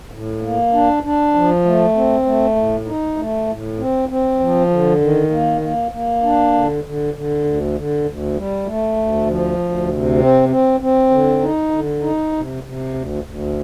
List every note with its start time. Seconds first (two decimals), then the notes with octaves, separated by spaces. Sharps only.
0.11 A2
0.42 A#3
0.73 D4
1.03 D4
1.34 F3
1.65 A3
1.95 C4
2.25 A3
2.56 A2
2.86 D#4
3.17 A3
3.47 A2
3.79 C4
4.09 C4
4.40 F3
4.69 D3
5.00 D#3
5.30 A#3
5.61 A#3
5.91 A#3
6.23 D4
6.53 D3
6.84 D3
7.14 D3
7.44 D2
7.75 D3
8.05 D2
8.35 G3
8.66 A3
8.96 D2
9.27 F3
9.58 D2
9.88 C3
10.18 C4
10.49 C4
10.80 C4
11.10 D3
11.41 D#4
11.71 D3
12.02 D#4
12.32 C3
12.63 C3
12.94 D2
13.24 D2